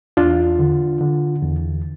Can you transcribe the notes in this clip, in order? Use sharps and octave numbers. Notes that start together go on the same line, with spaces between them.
E2 D4 F4
D3
D3
E2